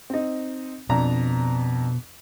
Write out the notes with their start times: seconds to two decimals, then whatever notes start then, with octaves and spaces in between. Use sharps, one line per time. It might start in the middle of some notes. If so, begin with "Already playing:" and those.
0.10 C4 D#4
0.89 F2 B2 D4 A#5